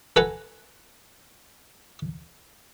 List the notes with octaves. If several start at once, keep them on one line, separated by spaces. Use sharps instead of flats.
A4 B4 F#5 G#5 A#5